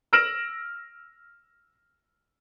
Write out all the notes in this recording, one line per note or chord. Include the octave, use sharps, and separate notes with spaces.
E6 F6 A#6 D7 E7 F#7